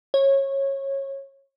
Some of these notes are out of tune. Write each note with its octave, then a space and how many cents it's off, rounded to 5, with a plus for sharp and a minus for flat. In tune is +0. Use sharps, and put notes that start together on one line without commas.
C#5 -20